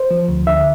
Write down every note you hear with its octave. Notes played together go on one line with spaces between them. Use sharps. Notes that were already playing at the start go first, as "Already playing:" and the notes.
Already playing: C5
F3
D2
D3 E5